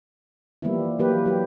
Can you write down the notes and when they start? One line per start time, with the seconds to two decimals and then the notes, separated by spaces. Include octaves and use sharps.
0.62 E3 F3 G3 A#3 B3 E4
0.99 E3 F#3 A#3 G4 B4
1.26 F#3 G4